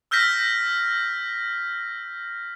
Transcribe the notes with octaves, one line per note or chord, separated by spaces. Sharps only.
E6 F6 G6 A#6 B6